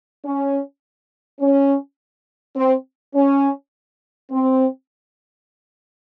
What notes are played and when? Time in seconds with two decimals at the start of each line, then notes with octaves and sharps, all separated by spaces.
0.24 C#4
1.40 C#4
2.56 C4
3.14 C#4
4.31 C4